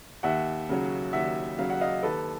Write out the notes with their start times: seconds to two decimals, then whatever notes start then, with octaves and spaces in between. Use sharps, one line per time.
0.23 D#2 E5 F#5
0.69 C#3 F#3
1.13 D#2 E5 F#5
1.58 C#3 F#3 F5
1.70 F#5
1.81 D#5 F5
2.03 D#2 A4 B4